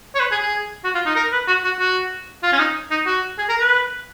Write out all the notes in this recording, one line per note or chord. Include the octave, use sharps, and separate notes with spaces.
C#5
B4
G#4
G#4
F#4
F4
D#4
A#4
B4
F#4
F#4
F#4
F4
C#4
D#4
D#4
F#4
G#4
A#4
B4